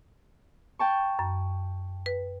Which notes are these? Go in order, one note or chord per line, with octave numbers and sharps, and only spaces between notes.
G5 A5 C#6
F#2
B4